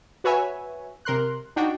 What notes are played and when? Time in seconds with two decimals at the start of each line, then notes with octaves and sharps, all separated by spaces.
0.24 F#4 B4 C#5 E5 G#5
1.05 C3 A#4 C6 F#6
1.56 D4 D#4 F#4 G5